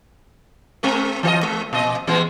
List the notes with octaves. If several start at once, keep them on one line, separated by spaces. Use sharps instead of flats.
G#3 C4 A#4
E3 C5 D#5
G#3
A#2 D#5
E3 G#3 B3